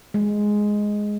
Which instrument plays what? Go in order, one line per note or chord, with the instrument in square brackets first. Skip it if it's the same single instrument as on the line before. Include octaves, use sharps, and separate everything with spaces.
[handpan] G#3